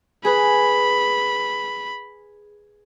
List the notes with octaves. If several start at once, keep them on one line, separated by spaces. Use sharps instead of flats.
G#4 B4 B5